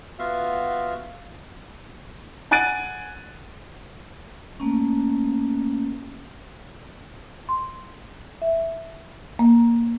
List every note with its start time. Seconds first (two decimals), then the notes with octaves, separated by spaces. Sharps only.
0.19 B3 F4 F#4 E5 F5
2.51 F#5 G#5 F#6 A6 D7 D#7
4.60 A3 A#3 C#4
7.49 C6
8.42 E5
9.39 A#3